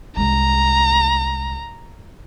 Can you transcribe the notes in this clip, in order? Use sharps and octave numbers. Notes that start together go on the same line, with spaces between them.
C2 G#3 A#5